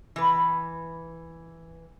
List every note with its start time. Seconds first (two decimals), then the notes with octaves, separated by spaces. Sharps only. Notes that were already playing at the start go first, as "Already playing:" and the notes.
0.16 E3 B4